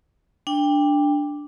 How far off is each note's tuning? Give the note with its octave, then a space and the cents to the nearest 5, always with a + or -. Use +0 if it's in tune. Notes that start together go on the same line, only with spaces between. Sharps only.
D4 +0 G5 +20